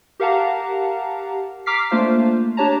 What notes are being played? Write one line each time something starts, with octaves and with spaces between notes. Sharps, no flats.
G4 A#4 F5 F#5 A5 A#5
A#5 D6 F6 B6 C7
A3 A#3 D4 F4 C5 F5
D4 G4 C#5 A5 A#5